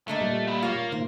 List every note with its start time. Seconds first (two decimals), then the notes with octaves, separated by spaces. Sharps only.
0.08 D3 A3 A#3 D#5
0.21 A#2 G3
0.47 E4 F4
0.63 A#3 F4 C#5
0.92 A#2 D#3 C5